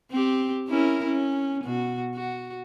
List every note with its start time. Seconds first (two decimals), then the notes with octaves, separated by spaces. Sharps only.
0.11 C4 G4
0.68 C#4 E4 A#4
1.04 C#4
1.64 B2 F#4
2.15 F#4